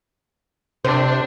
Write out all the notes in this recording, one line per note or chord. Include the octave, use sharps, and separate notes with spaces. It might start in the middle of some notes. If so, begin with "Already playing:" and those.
C3 D4 C5